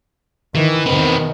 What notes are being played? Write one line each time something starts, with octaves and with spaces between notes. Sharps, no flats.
D#3 E3
E2 B2 D#3 C4 B4